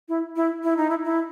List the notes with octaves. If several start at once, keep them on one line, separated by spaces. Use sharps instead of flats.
E4
E4
E4
D#4
E4
E4